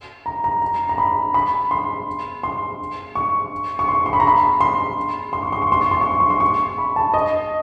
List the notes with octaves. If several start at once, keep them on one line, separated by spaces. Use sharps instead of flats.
A#5
A#5
A#5
A#5
B5
B5
C6
C6
C#6
C#6
C6
C6
B5
A#5
B5
C6
C6
C#6
C6
C#6
C6
C#6
C6
C#6
C6
C#6
C6
C#6
C6
B5
A5
D#5